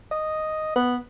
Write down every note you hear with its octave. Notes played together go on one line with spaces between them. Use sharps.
D#5
B3